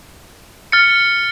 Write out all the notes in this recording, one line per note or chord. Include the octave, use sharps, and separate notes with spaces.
F6 A6 C#7